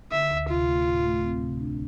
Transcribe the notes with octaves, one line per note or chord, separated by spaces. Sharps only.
D3 E5
D2
C3 F4
A3
A2
A3
C4
C3
D4